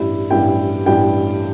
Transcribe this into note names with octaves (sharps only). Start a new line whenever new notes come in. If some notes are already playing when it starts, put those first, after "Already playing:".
Already playing: A1 G2 G3 E4
A1 G2 G3 E4 G5
A1 G2 G3 E4 G5